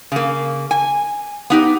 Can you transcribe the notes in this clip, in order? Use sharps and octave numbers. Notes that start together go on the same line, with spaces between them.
C#3 A#3
G#5
B3 D#4 G4